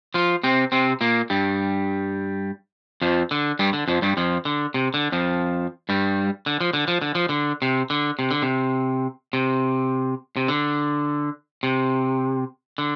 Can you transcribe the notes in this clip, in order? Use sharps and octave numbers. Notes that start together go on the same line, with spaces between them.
F3 F4
C3 C4
C3 C4
A#2 A#3
G2 G3
F2 F3
D3
G2 G3
D3
F2 F3
G2 G3
F2 F3
D3
C3
D3
F2 F3
G2 G3
D3
F3
D3
F3
D3
F3
D3
C3
D3
C3
D3
C3
C3
C3
D3
C3
D3